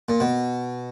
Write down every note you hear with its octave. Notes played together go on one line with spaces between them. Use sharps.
A#2
B2